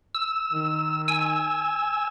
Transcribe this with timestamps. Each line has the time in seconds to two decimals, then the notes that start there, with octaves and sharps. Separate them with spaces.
0.15 E6
0.53 D#3
1.08 G#5 E6